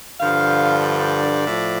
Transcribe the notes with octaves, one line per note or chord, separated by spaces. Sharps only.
G2 D3 F3 F5
D5
A2 F3